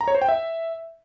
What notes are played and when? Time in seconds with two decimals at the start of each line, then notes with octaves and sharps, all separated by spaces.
0.01 A#5
0.08 C#5
0.15 C5
0.22 G5
0.29 E5